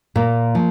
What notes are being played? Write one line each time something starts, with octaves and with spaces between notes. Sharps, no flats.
A#2 A#3
F3